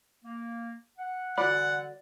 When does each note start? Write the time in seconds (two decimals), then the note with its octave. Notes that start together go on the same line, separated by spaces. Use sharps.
0.24 A#3
0.98 F#5
1.38 D3 E3 G3 F#4 D5 F#5 B5